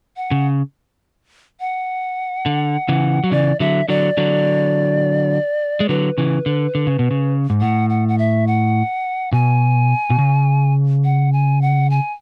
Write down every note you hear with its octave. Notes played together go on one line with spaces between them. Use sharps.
F#5
C#3
F#5
D3
C#3 E3
F#3
C#3 E3 D5
D3 F#3 E5
D3 F#3 D5
D3 F#3
G#3
D3 F#3 B4
C#3 E3
D3
D3
C#3
B2
C#3
G#2
A2 F#5
F#5
F#5
E5
F#5
B2 G#5
B2
C#3
F#5
G#5
F#5
G#5